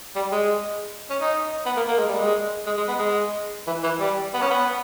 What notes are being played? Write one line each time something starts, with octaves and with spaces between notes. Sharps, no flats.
G3
G#3
C#4
D#4
B3
A#3
A#3
G#3
G3
G#3
G#3
G#3
B3
G#3
E3
E3
G3
B3
C#4
B3